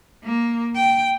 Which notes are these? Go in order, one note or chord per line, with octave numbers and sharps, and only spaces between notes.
A#3
G5